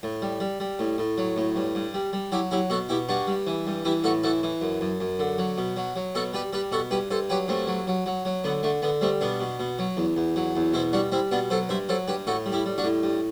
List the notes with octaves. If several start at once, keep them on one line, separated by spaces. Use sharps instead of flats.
A2
G3
G3
G3
A2
A2
F#3
A2
G2
G2
G3
G3
F#3 E4 G4
F#3 E4 G4
B2 F#4 A4
B2 E4 G4
G2 D4 F#4
G3
E3
G2
E3 E4 G4
A2 F#4 A4
E3 F#4 A4
E3
F#2
F#2
F#2
D3
F#3
B2
F#3
F#3
B2 F#4 A4
G3 G4 B4
G3 G4 B4
B2 F#4 A4
G2 G4 B4
G2 A4 C5
F#3 G4 B4
G2 A3 C4
F#3
F#3
F#3
F#3
D3 B3
D3 A3
D3 B3
G3 A3 C4
B2 B3 D4
B2
B2
F#3
E2
E2
F#3
E2
B2 C4 E4
G3 D4 F#4
G3 C4 E4
B2 B3 D4
F#3 A4 C5
G2 C5 E5
F#3 A4 C5
G2 G4 B4
A2 F#4 A4
G3
E4 G4
G3
D4 F#4
A2
G2